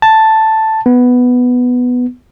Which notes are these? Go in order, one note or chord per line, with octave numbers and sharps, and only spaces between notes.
A5
B3